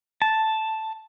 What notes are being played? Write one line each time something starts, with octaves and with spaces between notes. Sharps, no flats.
A5